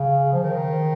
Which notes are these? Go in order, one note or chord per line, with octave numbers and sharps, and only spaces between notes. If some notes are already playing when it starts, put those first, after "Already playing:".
Already playing: C#3
F3
D#3